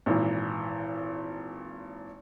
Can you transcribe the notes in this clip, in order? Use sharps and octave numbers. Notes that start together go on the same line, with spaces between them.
G#1 A#2 E3